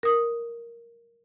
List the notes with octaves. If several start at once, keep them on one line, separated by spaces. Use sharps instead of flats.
A#4 D#6